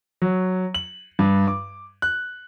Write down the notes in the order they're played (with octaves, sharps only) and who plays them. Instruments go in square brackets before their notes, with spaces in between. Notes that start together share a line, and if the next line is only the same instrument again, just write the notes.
[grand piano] F#3
F#7
G2
D6
F#6